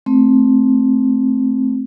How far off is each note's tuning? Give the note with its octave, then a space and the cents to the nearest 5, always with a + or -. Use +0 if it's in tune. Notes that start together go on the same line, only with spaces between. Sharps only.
A3 +0 C4 +10